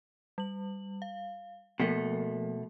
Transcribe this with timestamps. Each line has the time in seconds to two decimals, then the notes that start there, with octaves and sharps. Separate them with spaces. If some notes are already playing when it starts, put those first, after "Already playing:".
0.38 G3 F#7
1.02 F5
1.80 B2 F3 A3 A#3 A#4